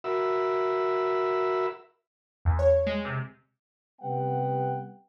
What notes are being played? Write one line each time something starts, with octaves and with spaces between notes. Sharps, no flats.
F#4 A#4 E5 B5 E6
E2
C#5
G#3
C3
C3 G3 B3 F#5 G5